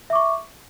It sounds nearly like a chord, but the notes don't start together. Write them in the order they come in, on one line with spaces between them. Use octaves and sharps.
E5 D6 C#6